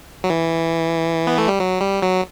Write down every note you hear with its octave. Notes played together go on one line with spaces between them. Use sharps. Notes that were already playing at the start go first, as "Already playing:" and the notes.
F#3
E3
B3
A3
G3
F#3
G3
F#3